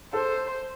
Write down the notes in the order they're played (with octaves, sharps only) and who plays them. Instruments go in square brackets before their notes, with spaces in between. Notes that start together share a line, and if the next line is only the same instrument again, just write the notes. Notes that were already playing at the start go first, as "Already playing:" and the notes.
[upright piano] A4 [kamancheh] C5